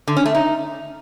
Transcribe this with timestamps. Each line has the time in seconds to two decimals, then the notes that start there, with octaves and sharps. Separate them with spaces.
0.08 D3
0.17 C#4
0.26 A3
0.35 D#4